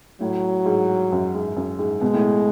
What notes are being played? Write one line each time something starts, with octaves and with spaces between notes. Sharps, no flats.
A2 F#3
G#2
F#2
G#2
F#2
G#2
B2 G#3
A2